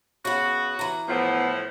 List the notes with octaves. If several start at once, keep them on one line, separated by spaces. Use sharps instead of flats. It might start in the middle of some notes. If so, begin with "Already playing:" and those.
C#3 B3 F#4
E3 A#5
A2 F3 B3